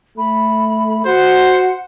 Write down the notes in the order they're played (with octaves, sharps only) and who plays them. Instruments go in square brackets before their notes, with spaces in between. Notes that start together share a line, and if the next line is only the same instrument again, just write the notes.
[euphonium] A3 [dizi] B5
[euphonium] F#4 [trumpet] C5 [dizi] F#5